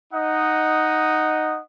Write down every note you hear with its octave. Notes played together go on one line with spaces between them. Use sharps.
D#4 D#5 F#5 D#6